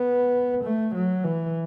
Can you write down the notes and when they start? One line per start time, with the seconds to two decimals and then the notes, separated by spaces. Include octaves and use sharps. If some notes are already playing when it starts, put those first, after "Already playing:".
Already playing: B3
0.64 A3
0.95 F#3
1.24 E3